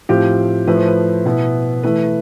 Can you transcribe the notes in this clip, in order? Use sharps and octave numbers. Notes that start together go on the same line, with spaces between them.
A2 F3 C4 F4 G4
A2 F3 A3 E4 B4
C5
B4
B2 B3 E4
E3 A3 E4 B4